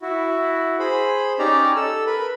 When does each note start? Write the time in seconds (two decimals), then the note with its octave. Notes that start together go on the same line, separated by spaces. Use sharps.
0.02 E4 F#4
0.79 G#4 C5 B5
1.39 C#4 D#4 G4 D5 A#5
1.76 A4 E6
2.07 A#4 B4 B5